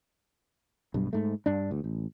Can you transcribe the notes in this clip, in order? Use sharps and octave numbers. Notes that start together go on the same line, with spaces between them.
B1 G2
G#2 A3
G2 D4
D2
A1